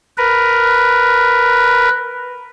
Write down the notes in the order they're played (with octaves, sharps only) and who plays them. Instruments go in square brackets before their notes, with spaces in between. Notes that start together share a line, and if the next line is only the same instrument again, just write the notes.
[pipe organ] A#4 B4